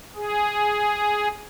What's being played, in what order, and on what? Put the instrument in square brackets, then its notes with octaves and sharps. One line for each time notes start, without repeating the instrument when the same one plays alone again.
[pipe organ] G#4